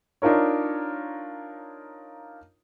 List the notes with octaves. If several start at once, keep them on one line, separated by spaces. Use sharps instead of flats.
D4 D#4 F4 A#4 C#5